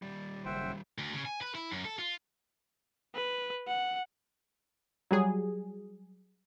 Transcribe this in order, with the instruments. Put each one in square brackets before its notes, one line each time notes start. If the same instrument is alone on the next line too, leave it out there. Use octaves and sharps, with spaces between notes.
[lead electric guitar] D#2 G3 [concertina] D5
[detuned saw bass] F#1 [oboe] C5 [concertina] E5 F#5 G5
[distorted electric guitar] D2
C#3
G#5
B4
E4
F#2
A4
F4
[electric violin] B4
F#5
[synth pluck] F#3 G3 G#4